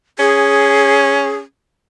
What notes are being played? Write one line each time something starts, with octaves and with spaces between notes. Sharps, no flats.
C#4 G#4